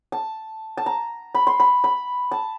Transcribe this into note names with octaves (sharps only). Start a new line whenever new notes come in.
A5
A5
A#5
B5
C6
B5
B5
A5